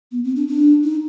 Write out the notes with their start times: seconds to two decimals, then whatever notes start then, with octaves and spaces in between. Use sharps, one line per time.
0.12 B3
0.24 C4
0.36 D4
0.48 D4
0.83 D#4